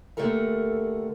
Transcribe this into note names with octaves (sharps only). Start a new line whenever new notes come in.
D3 A3 A#3 G4 A4 A#4